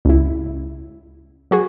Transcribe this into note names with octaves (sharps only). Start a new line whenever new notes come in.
C#2 E4
F#3 F#4 G#4